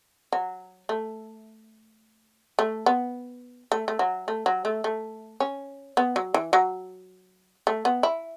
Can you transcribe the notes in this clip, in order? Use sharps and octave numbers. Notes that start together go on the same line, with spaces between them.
F#3
A3
A3
B3
A3
A3
F#3
A3
F#3
A3
A3
C#4
B3
F#3
E3
F#3
A3
B3
E4